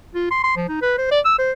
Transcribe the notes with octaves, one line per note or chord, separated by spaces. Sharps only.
F4
C6
C6
F3
D#4
B4
C5
D5
E6
C5